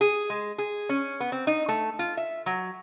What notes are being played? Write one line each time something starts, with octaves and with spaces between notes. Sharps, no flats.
G#4
G#3
G#4
C#4
B3
C4
D#4
A3
F4
E5
F#3